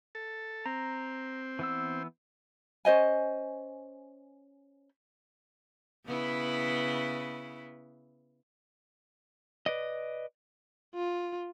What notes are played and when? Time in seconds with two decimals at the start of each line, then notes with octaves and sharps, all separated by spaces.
0.15 A4
0.66 C4 A#5
1.59 E3 B3 E6
2.85 C#4 C5 D#5 G#5
6.06 C#3 B3 E4
9.66 B4 D5 D#5
10.95 F4